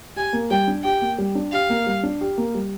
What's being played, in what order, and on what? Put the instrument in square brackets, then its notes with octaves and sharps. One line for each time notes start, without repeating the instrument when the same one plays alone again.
[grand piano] G4 [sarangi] G#5
[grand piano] A#3
[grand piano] G3 [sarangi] G5
[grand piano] D4
[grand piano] G4 [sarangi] G5
[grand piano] A#3
G3
D4
[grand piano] G4 [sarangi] F5
[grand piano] A#3
G3
D4
G4
A#3
G3